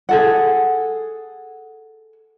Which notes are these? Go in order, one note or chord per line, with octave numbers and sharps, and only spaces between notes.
G#4 A4 F#5